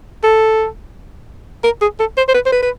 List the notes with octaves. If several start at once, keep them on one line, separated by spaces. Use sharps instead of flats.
A4
A#4
G#4
A4
C5
C5
B4
C5
B4
B4